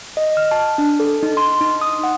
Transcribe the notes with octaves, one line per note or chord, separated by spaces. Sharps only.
D#5
F6
A5
D4
A4
D#4
C6
D#4
D#6
F#5